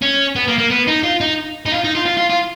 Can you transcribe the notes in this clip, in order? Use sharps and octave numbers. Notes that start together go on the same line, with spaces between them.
C#4
B3
A#3
A#3
B3
D#4
F4
D#4
D#4
F4
D#4
F4
F4
F4
F4